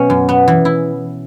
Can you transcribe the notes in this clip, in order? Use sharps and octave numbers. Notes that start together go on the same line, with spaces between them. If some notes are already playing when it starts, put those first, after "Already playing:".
Already playing: B2 F#3 C#4
F#2
B3
E3
E4